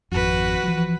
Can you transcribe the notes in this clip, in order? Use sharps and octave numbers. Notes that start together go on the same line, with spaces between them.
G#1 F2 F#4 B4
E3 F3